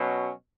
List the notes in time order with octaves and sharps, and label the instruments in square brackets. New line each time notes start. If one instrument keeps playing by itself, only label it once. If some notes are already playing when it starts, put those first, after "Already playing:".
Already playing: [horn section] B2 F#3 C#4